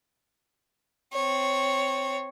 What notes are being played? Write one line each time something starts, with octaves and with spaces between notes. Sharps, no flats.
C4 C#5